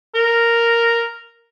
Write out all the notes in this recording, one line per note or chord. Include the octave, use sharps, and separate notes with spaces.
A#4